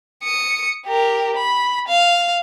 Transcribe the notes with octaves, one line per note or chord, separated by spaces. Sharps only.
D#6 C#7
G4 A#4
B5
F5